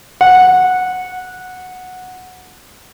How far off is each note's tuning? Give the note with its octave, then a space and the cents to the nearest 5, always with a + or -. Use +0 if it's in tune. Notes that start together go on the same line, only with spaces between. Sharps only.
F#5 -10